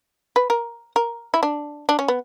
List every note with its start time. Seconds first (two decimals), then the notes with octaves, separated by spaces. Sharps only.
0.36 B4
0.50 A#4
0.96 A#4
1.34 E4
1.43 D4
1.89 D4
1.99 C#4
2.08 B3